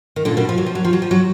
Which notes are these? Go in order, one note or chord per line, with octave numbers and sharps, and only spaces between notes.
D#3
A#2 D3
B2 D#3
F3
F#3
F3
F#3
F3
F#3
F3
F#3